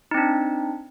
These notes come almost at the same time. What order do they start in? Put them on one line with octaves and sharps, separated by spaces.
D#4 C4 D4